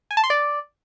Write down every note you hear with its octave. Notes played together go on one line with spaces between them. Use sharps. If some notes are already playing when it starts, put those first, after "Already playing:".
G#5
A5
C6
D5